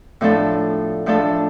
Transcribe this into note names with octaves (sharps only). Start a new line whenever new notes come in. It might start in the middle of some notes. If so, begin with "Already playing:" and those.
A2 F3 A3 D4 A4
A2 F3 A3 D4 A4